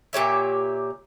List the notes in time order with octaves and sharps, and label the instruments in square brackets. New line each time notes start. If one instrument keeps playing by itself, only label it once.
[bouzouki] A#2 G4 C#5 E5